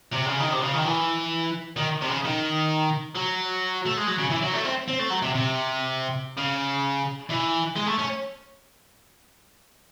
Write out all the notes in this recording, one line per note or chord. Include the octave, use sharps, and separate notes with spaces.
C3
C#3
D#3
C3
C#3
D#3
E3
D#3
C3
C#3
D#3
F#3
A3
G#3
F#3
C#3
E3
F#3
A3
C4
C4
A3
F#3
C3
C3
C#3
E3
G#3
A3
C#4